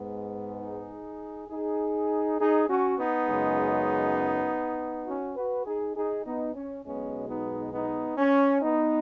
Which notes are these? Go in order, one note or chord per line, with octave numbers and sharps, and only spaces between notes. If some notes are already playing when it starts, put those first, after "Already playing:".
Already playing: G#2 G#3 B3
D#4 G#4
D#4 G#4
D#4 G#4
C#4 F#4
B3 D#4
F#2 C#3 G#3
C#4 F#4
F#4 B4
D#4 G#4
D#4 G#4
B3 D#4
C#4
B1 B2 G#3 B3 C#4
B3 D#4
B3 D#4
C#4
B3 D#4